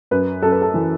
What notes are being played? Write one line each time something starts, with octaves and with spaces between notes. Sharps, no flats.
F#2 B4
F#2 A4
B4
A4
E3